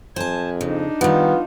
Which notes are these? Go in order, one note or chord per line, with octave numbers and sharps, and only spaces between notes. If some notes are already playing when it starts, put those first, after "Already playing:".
F2 C5 G#5 A5
C#3 D4 D#4
D#3 G3 B3 F4